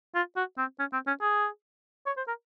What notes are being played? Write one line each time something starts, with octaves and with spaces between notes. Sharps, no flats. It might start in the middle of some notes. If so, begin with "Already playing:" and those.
F4
F#4
C4
C#4
C4
C#4
G#4
C#5
C5
A#4